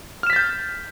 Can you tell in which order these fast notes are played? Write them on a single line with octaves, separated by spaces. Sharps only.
F6 E7 B6 A6 G6